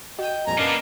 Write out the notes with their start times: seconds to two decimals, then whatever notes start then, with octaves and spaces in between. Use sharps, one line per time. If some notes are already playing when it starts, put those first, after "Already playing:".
0.19 F#4 D#5 G5 D#7
0.47 F2 A#2 G3 G#5 A#5
0.58 F#2 C#3 A#3 B3 D4 F4 A#4 A#6